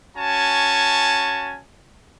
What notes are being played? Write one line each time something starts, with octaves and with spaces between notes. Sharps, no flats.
C#4 F#4 G#5 A5